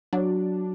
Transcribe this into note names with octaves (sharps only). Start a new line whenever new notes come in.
F#3 D4